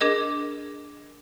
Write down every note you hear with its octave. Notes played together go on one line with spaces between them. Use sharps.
D4 G#4 A#4 D#5